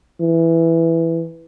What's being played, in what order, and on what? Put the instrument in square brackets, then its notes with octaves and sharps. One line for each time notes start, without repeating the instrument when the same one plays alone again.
[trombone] E3